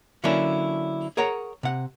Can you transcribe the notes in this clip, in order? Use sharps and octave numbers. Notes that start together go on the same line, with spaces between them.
D3 F#3 A#3 C#4 D4 E4
G#4 A#4 C#5 F#5 A#5
C3 F#5